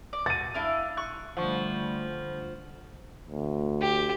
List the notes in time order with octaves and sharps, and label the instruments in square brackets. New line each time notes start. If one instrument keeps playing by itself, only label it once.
[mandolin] D5
[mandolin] F#4 [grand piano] A6 D#7
[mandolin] D4 E4 F5
C#6 F#6
[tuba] D3 [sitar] F3 [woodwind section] G3 A3 [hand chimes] F#5 C#6
[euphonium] D2
[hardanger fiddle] G4